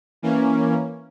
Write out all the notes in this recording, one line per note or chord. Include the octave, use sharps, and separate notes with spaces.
E3 A#3 C#4